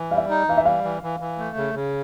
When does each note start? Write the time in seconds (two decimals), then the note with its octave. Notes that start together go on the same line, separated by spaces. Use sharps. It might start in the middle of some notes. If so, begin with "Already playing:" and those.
Already playing: E3
0.11 G3 F5
0.17 E5
0.29 D#4
0.48 E3 F5
0.57 E5
0.65 G3 F5
0.84 E3
1.03 E3
1.20 E3
1.38 A3
1.57 C#3
1.75 C#3